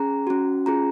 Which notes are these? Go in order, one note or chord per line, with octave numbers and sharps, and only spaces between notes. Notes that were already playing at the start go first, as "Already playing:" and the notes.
Already playing: C#4 G#4 A#5
C#4 F#4
C#4 F4 G#4 A#5